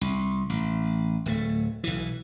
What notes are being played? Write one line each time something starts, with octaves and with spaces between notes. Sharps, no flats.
C2
A1
D1 A3
B1 E3